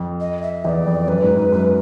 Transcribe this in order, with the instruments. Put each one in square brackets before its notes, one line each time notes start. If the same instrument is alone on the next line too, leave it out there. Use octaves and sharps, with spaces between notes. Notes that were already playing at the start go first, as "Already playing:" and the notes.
Already playing: [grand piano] F2
[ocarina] D#5
E5
[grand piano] E2 [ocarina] D#5
[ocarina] D5
[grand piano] F2
[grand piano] F#2 [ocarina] B4
[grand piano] G#2
G#2
F#2